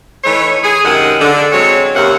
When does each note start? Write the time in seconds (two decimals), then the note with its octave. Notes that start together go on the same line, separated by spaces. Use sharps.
0.24 E3 A3 D#4 C#5
0.63 G#4
0.83 F#2 C3 D#3 G#3 F#5
1.20 D3
1.51 F#3 G#3 C4 C#5
1.94 D#2 C3 A#3 C#4 F#5